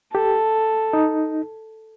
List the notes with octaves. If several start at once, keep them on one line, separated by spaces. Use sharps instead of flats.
G4 A4
D#4